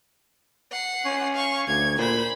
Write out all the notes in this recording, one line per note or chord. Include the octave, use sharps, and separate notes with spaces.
F#5 C7
C#4
F5 C#6
D2 G#6
A#2 C5 B5